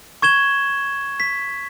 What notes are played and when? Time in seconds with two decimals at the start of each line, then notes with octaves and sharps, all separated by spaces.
0.22 C#6 G#6 E7 G7
1.20 B6